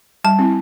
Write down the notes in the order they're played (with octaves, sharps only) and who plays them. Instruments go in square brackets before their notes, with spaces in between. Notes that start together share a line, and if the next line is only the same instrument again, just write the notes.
[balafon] G3 [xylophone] A5
[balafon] C4 E4